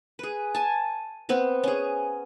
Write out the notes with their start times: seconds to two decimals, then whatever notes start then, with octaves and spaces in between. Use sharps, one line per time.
0.19 G#4 B4
0.54 G#5 A5
1.29 B3 C4 B4
1.64 C#4 G#4